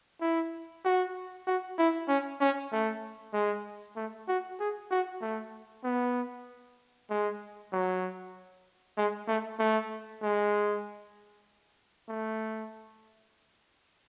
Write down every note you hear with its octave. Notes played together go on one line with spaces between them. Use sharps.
E4
F#4
F#4
E4
C#4
C#4
A3
G#3
A3
F#4
G#4
F#4
A3
B3
G#3
F#3
G#3
A3
A3
G#3
A3